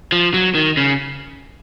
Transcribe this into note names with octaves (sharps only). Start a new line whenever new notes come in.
F3
F#3
D#3
C#3